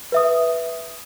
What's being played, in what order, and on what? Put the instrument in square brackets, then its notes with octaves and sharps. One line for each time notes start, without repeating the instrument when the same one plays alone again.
[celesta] B4 E5 D#6